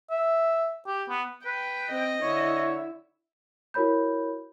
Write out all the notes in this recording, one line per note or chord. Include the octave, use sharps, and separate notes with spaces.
E5
G4
B3
B4 G5
C4 D#5
D3 E4 C#5 E5
E4 F#4 A#4 C#5 B5 G6